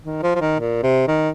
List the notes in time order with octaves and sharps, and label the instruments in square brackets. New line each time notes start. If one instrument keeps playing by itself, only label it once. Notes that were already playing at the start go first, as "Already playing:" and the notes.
[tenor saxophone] D#3
F3
F3
D#3
A#2
C3
D#3